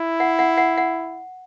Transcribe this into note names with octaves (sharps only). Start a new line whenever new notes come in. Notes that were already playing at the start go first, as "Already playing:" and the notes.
Already playing: E4
F#5
F#5
F#5
F#5